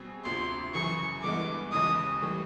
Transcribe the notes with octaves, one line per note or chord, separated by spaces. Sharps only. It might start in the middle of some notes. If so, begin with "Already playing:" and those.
Already playing: B2 G3 C4 G#4
D2 C3 F3 C6
F#2 C#3 E3 C#6
G2 E3 G#3 B3 E4 D6
D#2 C#3 E3 G#3 D#6
A2 E3 G3